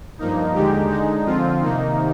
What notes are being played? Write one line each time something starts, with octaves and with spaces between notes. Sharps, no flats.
G2 F3 A#3 D#4
D#2 D3 G#3 D#4 G4
D3 G#3 D#4
F2 D3 F3 C4 F4
C3 D#3 A#3 D#4